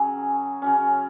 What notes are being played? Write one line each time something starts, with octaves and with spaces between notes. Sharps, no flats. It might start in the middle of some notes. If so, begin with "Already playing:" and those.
Already playing: C#3 F#3 C#4 G#4
C#3 F#3 C#4